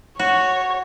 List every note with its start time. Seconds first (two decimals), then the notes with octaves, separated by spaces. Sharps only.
0.19 F#4 C#5